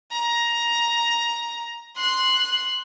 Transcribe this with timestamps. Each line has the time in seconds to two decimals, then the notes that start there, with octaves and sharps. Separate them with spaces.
0.11 A#5
1.96 C6 F#6